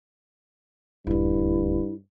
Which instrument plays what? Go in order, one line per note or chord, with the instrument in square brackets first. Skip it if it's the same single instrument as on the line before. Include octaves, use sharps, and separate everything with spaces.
[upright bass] D#1 D2 [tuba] G2 [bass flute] E4